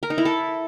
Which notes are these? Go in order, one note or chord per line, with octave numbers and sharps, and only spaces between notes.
A#4
D#4
E4
A4